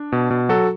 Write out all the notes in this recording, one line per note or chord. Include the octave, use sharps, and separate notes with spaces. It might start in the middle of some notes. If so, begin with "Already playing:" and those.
Already playing: D4
B2
B2
F#3 F#4 A4